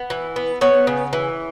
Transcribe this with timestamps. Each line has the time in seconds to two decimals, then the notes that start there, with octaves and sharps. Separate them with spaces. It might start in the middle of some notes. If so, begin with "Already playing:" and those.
Already playing: B3
0.10 E3
0.36 B3
0.61 B3 C#5
0.87 C#3
1.13 E3